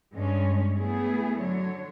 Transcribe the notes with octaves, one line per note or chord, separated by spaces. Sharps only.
G2 G#3 C#4
A3 B3 E4 G#4
D3 F#3 C#5